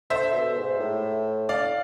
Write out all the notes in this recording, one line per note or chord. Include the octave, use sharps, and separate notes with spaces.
D3 C5 E5
B2
G#2
A2
D5 F5